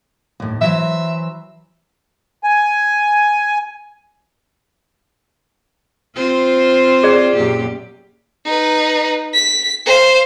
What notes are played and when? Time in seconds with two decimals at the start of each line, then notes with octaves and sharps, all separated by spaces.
0.40 D#2 A2
0.61 E3 F#3 C5 E5
2.44 G#5
6.16 C4 F4 C5
7.03 G#4 D5
7.35 F#2 A#2 G4
8.46 D#4 B4
9.34 B6
9.86 C5 F5